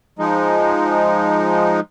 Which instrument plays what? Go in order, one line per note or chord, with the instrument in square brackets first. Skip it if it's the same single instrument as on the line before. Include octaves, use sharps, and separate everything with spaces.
[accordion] F3 G#3 D#4